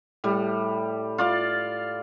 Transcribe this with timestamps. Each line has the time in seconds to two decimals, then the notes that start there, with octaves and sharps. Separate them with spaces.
0.24 A2 G3
1.18 F4 D5 F5